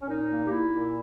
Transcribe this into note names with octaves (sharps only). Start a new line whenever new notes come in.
C#4
A#2 D#4
A#3
G4
A#3 E4
A#2